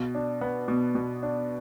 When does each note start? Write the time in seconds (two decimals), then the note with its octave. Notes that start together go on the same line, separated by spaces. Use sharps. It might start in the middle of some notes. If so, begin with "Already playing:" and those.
Already playing: B2
0.15 D4
0.41 B3
0.68 B2
0.95 B2
1.23 D4